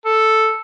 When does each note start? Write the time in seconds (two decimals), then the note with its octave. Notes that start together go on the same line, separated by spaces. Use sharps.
0.05 A4